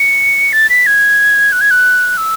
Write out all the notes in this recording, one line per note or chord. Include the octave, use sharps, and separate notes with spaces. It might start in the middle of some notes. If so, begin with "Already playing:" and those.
Already playing: C#7
A6
B6
G#6
F#6
G#6
F#6
E6